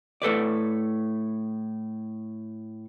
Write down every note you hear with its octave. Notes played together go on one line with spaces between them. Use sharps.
A2 A4 B4 D5